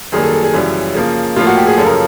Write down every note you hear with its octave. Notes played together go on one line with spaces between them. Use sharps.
F#2 D#3 G3 A#3 G#4
A4
A4
G#4
F#2 C#3 E3 G3
C#3 F3 A#3
A2 F3 A#3 F4
F#4
G4
G#4
F#2 C#3 F3 A4
A#4